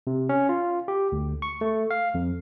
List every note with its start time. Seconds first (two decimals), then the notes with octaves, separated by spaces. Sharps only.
0.07 C3
0.29 C#4
0.49 F4
0.88 G4
1.12 D2
1.42 C#6
1.61 A3
1.91 F5
2.14 F2